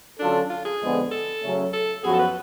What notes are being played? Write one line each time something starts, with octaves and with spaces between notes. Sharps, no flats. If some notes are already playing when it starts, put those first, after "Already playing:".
D3 F#3 C#4 D4 F4 A4
F4
G#4
F2 D3 G#3 B3 D4
A4
C#3 F#3 A3 C#4
A4
F#2 F3 B3 F#4 G#4
A4
B4